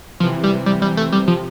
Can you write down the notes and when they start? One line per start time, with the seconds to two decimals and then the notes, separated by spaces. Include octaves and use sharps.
0.20 C3 E3 F3
0.44 G3
0.66 C3 G3
0.82 G3
0.97 A3
1.12 C3 G3
1.28 F3